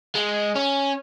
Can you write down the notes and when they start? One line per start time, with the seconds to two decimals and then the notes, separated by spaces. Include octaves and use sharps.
0.15 G#3
0.55 C#4